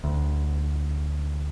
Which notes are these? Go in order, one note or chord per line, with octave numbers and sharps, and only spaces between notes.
D2